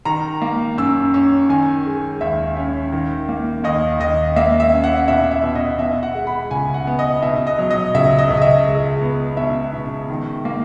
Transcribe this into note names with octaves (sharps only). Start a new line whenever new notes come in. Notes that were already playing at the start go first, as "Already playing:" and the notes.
D#3 A#5
A#3
F#2 E6
C#4
D#3 G#5
G#3
D#2 E5
C#4
D#3
A#3
D#2 D#5
D#2 D#5
A#3 E5
E5
C#4
F#5
B2 E5
E5
B2
D#5
B2 E5
F#5
G#3
B5
C#2 G#5
F#5
B3
D#5
B2 E5
D#5
F#3
D#5
C#2 E5
D#5
C#2
D#5
E5
G#3
B3
B2 E5
B2
D#3
A#3